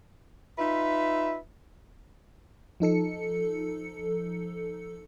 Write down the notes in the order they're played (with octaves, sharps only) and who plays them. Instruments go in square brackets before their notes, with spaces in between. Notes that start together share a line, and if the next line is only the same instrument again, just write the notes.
[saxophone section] D#4 F4 B4 E5
[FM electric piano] F3 D#4 A4 C#7